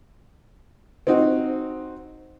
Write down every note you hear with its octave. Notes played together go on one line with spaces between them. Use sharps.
C4 D#4 F#4